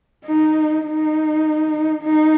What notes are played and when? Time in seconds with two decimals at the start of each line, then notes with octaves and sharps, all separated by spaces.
0.25 D#4
0.85 D#4
2.03 D#4